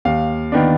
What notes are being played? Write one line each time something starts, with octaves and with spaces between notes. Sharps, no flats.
D#2 F5
D#3 B3 D4